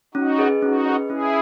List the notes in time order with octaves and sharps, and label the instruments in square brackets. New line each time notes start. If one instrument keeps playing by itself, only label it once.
[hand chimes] C#4 [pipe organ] D#4 F#4
[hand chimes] G#4 B4 D#5
[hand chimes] C#4 [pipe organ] D#4 F#4
[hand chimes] G#4 B4 D#5
[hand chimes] C#4 [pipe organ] E4 G#4